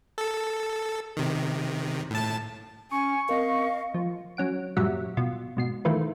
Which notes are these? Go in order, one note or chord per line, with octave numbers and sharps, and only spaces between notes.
A4
C3 D#3
A2 A5
C#4 G#5 C#6
C4 A#4 D#5 F5
F3
F#3 C#4 F#5 D7
F#2 A#2 G3 F#4 E5 F#5
B2 F4
G#2 B2 C7
D#3 E3 A3 F4 B4